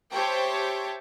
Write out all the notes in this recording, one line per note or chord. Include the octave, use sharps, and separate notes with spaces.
G4 C5 C#5 E5 G5 A5